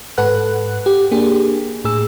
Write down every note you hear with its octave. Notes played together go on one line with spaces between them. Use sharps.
G#2 A4 B4 F#5 F#6
G4
A#3 D4 G4 G#4
A2 G#4 E6